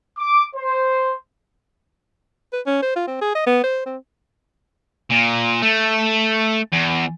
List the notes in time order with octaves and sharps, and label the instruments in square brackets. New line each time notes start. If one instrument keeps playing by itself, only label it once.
[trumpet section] D6
C5
[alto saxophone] B4
C#4
C5
F4
C4
G#4
D#5
B3
C5
C4
[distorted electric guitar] A#2
A3
E2